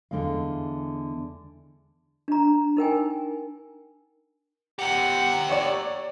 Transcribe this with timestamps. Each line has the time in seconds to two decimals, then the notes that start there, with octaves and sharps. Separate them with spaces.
0.11 E2 D3 G#3 D#5 F5
2.28 D4 A#5
2.77 D#4 A#4 G5 G#5
4.79 G4 A#4 F#5
5.49 C#5 D5